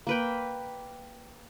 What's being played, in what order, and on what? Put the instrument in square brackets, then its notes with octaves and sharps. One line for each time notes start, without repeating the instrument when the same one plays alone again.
[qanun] A#3 B4 G5